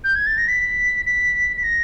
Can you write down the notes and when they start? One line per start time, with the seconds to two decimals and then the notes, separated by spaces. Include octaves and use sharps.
0.04 G6
0.15 G#6
0.27 A6
0.38 A#6
0.48 B6
1.06 B6
1.56 B6
1.63 A#6